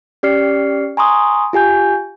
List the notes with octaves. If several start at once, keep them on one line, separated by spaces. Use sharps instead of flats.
C#4 G4 D5 F6 C7 C#7
G#5 A#5 C6 C#6 D#6
F4 G4 G#5 G6